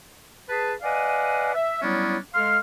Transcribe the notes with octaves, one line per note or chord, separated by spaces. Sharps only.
G#4 B4 A5
B4 D5 D#5 F5 F#5 G#5
E5
F#3 G3 B3 C#4 D4 E4
G#3 A4 F5 C6 F6